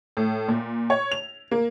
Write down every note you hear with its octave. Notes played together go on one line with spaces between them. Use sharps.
A2
A#2
C#5
F7
A#3